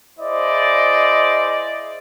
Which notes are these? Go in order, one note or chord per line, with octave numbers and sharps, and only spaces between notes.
E4 G#4 C5 D5 D#5